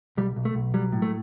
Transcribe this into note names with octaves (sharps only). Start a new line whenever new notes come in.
B1 G3
B1
A3
B1
F#3 G3
A2
A3